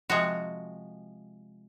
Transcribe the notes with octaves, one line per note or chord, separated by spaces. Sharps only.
C3 F3 G#3 F#4